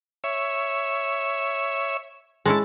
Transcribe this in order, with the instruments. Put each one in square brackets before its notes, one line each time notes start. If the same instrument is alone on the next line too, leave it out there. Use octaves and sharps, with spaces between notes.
[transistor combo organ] C#5 E5
[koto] G#3 C#4 E4 [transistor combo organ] A5